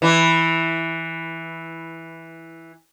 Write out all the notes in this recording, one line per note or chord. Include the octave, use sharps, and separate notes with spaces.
E3 E4